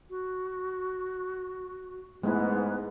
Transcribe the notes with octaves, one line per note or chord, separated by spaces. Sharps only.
F#4
G#2 G#3 A3 B3 E4